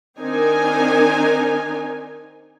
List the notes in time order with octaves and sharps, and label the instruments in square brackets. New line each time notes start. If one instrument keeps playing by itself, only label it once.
[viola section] D#3 C4 D4 D#4 A#4 G#5